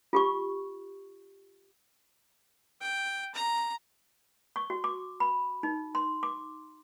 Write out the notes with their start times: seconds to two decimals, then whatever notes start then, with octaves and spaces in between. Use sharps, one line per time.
0.13 F4 G4 C#6
2.81 G5
3.35 A#5
4.56 C#6
4.70 F#4
4.84 D6
5.20 B5
5.63 D#4
5.95 C6
6.23 D6